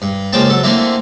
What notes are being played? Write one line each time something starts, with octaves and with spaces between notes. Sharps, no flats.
G2
C#2 C#3 F3 A#3 G5 A5
F#3 A4
D3 A3 A#3 C4 E4